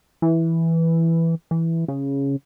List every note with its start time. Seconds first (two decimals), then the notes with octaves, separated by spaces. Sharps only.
0.22 E3
1.51 E3
1.88 C#3